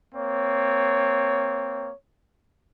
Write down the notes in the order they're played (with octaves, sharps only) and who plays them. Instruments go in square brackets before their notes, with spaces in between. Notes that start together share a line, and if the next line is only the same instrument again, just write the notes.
[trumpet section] A#3 C4 C#5